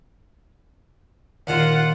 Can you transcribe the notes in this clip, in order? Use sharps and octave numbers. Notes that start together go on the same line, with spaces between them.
D#2 A#2 D#3 F4 F#5